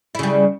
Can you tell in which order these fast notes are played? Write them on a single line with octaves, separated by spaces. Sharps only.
E4 C#3 G3